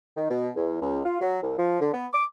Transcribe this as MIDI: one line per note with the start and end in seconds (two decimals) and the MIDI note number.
0.17 0.25 51
0.30 0.49 47
0.56 0.81 40
0.82 1.01 37
1.05 1.18 65
1.21 1.41 54
1.43 1.54 36
1.58 1.80 53
1.81 1.92 50
1.94 2.06 59
2.13 2.25 86